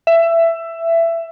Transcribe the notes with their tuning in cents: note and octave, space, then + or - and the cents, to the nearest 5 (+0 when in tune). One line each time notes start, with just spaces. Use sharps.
E5 +15